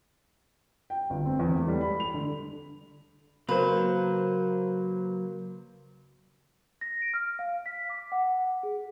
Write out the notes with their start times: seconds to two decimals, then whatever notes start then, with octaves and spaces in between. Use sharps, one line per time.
0.90 G5
1.10 G1
1.25 C4
1.39 E2
1.56 A3
1.68 G3
1.81 B5
2.00 F7
2.14 D3
3.49 C#3 F#3 A#3 B4 C5
6.81 A#6
7.02 D7
7.14 F6
7.39 F5
7.66 B6
7.90 D6
8.12 F#5
8.63 G#4